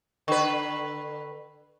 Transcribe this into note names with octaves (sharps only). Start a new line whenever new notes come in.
D3 B4